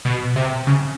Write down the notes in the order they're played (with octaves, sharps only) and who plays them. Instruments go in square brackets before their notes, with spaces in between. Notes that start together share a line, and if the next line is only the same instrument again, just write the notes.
[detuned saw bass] B2
C3
C#3